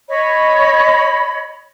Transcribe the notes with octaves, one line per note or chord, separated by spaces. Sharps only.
C#5 D#5 B5